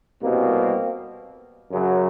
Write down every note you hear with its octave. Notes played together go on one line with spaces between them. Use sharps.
C2 B2 G3 A#3 C4
F#2 C#3 F#3